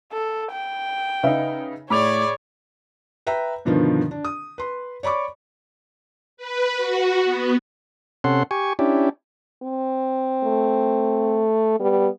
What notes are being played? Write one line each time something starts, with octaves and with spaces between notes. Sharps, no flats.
A4
G5
C#3 D#4 B4 E5 F5
A2 G#4 C#5 D5 B5 D6 F7
B4 E5 G5 A#5
G2 B2 D3 D#3 F3
D4
D#6
B4 C6
C#5 D5 B5 C#6 D6
B4
F#4
B3
C3 C#4 A4 F#5 C6
G4 G#5 C#6
C#4 D4 E4 G4
C4
A3
G3 B3